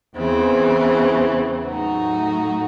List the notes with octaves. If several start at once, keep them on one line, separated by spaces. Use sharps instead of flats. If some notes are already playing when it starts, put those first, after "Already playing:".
E2 C#3 E3 C4
A2 F#3 A3 D#4 F#4